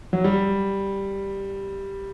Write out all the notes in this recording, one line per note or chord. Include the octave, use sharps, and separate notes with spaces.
F#3
G3